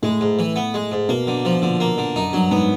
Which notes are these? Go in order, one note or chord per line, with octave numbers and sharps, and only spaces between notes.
A2 G#3
G#2
E3
B3
G#3
G#2
B2 A#3
D3
F3
B2
A#2 D3
A#3
D3
F#2 D#4
G2 F#3
G#2 B3